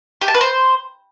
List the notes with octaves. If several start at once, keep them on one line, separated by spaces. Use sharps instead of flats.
G4
A5
B4
C5